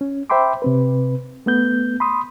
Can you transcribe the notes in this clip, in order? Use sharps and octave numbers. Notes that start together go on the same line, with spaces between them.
C#4
C5 E5 G5 B5 C6 D6
C3 C4 B4
A3 B3 G6
B5 C6 D#6